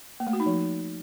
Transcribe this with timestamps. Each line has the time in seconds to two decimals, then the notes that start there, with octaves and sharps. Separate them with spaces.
0.20 A#3
0.27 A3
0.33 F#4
0.40 D#4
0.46 F3